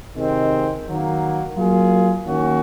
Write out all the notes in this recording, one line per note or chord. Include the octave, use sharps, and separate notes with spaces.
C3 D#3 G#3 C4
D#3 F#3 A#3
F#3 A#3 F4 G#4
D#3 A#3 C#4 F#4